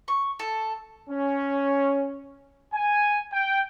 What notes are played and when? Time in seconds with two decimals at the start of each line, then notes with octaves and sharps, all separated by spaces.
0.08 C#6
0.39 A4
1.09 C#4
2.74 G#5
3.32 G5